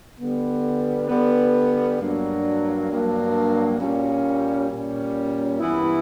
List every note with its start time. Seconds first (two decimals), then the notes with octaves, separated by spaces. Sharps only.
0.18 D3 G3 B3
1.09 D3 G3 B3
1.99 G2 F#3 A#3 D4
2.89 G2 F#3 A#3 D4
3.79 A#2 G3 C#4
4.69 A#2 G3 C#4
5.59 G2 E3 B3 E4